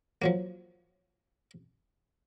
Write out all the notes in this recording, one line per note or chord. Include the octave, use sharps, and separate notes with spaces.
F3 F#3 A#3